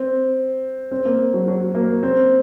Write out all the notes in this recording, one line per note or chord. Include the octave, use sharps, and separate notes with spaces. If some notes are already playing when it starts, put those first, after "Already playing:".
Already playing: C4
C4
A#3
F#3
F#3
A#3
C4